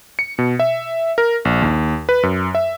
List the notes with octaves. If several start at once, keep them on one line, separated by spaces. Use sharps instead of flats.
C#7
B2
E5
A#4
A#1
D#2
B4
F#2
E5